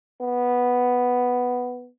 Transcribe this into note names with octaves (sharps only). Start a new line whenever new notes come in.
B3